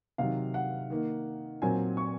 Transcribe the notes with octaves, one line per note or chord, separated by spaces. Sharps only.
C3 D#3 F#3 F5
F#5
D#3 A#3
A#2 F#3 C4 G#5
C#6